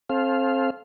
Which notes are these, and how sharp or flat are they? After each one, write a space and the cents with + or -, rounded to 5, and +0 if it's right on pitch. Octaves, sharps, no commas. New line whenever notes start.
C4 +25 A4 -25 F5 +0